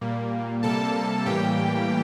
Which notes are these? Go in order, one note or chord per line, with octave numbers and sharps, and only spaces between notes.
A#2 G3 A#3
C3 G3 A#3 A4 A5
A2 E3 G3 A#3 G4 G5